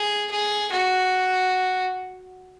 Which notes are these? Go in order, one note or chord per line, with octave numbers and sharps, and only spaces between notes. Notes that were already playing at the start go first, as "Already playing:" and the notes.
Already playing: G#4
G#4
F#4